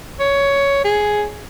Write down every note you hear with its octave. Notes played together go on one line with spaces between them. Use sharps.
C#5
G#4